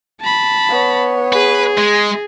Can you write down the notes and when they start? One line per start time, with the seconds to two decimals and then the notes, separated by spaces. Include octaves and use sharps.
0.21 A5 B5
0.69 B3 C#5
1.33 G#4 B4
1.77 G#3